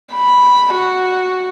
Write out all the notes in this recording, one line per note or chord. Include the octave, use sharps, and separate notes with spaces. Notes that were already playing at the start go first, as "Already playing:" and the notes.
B5
F#4